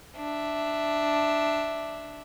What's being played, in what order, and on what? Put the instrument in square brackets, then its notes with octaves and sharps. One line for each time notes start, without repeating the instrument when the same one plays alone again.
[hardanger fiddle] D4 E5